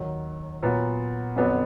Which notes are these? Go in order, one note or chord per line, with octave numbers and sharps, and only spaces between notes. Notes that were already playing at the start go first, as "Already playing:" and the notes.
Already playing: D#2 D#3 F#3
A#2 F#3 B3
F2 D3 F#3 B3 D4